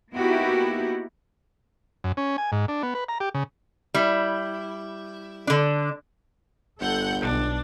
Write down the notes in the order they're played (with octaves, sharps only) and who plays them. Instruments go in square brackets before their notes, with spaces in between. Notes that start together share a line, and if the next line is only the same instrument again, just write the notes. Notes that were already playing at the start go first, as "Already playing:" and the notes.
[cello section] A#3 B3 D#4 E4 F#4 G4
[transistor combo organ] F#2
C#4
G#5
G#2
D4
B3
B4
A#5
G4
C#3
[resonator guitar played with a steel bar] G3 E4
D3 D4
[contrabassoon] G1 [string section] A4 F#5 G6
[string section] B1 [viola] D4